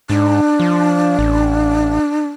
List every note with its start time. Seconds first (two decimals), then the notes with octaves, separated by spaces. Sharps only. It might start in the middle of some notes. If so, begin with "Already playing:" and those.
0.10 G#2 D4
0.60 F3
1.19 A1